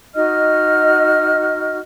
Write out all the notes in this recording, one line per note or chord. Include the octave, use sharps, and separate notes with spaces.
D#4 F#4 D#5 F6